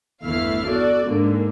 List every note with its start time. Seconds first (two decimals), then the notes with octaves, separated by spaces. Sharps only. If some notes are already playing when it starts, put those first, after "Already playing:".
0.23 G1 E2 A3 E4 F5 F6
0.67 F#4 A4 D5
1.05 G#2 D3 A#3